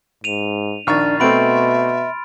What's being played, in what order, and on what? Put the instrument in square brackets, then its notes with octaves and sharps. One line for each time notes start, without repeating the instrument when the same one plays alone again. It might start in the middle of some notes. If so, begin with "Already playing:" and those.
[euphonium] G#2 [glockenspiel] D#7 F7
[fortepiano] A#1 D#3 C#6 [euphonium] D4 [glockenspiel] F6 A6
[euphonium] B2 [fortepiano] A3 C4 F#4 [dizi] E5 [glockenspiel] B5 C6 D7